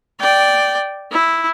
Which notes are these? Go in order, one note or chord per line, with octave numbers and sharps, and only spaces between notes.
D5 G5
E4